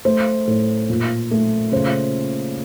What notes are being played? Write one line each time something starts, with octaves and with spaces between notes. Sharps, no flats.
A3 C5
A2
A#2
A3
C#3 C5